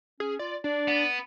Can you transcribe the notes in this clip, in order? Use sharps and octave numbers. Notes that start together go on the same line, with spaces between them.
C#4 G#4
F4 D5
D4 D5
B3